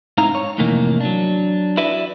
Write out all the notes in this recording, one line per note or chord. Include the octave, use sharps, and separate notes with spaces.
G#2 C4 D#4 E4 F5 A#5
C#5
F2 A2 C3 E3 A#3 D#4
F#3 D4
E4 F#4 B4 D5 E5